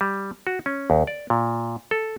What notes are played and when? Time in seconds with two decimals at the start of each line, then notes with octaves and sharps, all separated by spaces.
0.01 G3
0.47 F#4
0.66 C#4
0.90 D#2
1.07 D5
1.30 A#2
1.91 A4